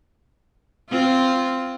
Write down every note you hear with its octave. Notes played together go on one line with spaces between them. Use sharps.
C4 F4